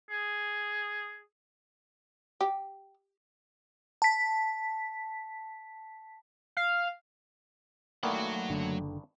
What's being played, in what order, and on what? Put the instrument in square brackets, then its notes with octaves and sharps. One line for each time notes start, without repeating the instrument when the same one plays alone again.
[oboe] G#4
[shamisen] G4
[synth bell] A5 B6
[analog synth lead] F5
[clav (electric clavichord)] G2 D#3 E3 [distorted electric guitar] F#3 F#5 [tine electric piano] A3 A#3
[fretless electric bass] F#1 D3